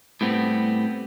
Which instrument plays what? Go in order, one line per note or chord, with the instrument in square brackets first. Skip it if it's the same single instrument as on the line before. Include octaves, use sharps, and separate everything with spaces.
[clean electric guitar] A2 G3 B3 C4